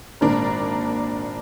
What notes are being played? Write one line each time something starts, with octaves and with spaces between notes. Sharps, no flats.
G#1 A#2 D4 A#4